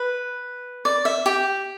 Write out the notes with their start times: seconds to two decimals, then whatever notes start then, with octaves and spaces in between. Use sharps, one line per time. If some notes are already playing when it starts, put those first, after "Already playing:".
Already playing: B4
0.85 D5
1.05 E5
1.26 G4